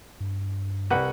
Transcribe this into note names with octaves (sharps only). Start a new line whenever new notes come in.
G2
C2 B4 F#5